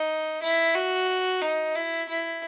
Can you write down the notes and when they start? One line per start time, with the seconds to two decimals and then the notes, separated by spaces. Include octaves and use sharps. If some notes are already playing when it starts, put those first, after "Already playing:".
Already playing: D#4
0.42 E4
0.75 F#4
1.42 D#4
1.75 E4
2.08 E4